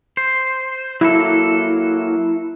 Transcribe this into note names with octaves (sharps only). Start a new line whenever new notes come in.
C5
F#3 A#3 E4 A4